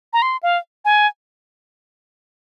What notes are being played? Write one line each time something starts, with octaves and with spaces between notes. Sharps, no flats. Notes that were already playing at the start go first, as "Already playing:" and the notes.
A#5
C6
F5
G#5